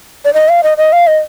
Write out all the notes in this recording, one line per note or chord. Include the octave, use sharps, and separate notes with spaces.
D5
D#5
F5
D#5
D#5
F5
D#5